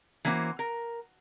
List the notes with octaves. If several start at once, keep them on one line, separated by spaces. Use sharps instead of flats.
E3 A#3 C#4 D#4 F#4 C5
A#4